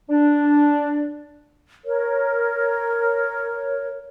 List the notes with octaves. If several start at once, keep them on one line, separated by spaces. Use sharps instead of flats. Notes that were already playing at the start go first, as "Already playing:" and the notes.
D4
A#4 C#5